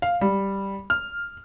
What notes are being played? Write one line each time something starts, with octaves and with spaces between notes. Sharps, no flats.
F5
G3
F6